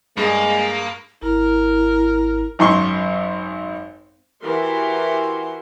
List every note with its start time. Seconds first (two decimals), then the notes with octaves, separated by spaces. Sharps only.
0.17 G2 G#3 A#3 G#4
1.22 G#1 E4 A#4
2.59 G#1 F#2 C6 C#6
4.44 E3 F#4 G4 A#4 C6